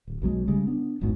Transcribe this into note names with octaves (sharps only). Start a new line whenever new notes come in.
D1
B1 B2 F#3 G#3
C#3 G3 G#3
B3 D4
E1 A1 G#2 B2